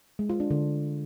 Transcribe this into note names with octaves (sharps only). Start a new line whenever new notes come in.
G#3
F4
D4
D3